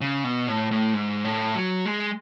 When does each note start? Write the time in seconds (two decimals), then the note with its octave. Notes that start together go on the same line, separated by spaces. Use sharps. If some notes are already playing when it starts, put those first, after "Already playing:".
0.01 C#3
0.24 B2
0.47 A2
0.71 A2
0.94 G#2
1.24 A2
1.55 F#3
1.86 G#3